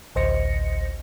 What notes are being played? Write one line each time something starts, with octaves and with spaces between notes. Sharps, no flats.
A1 D2 C5 D#5 A#6 C#7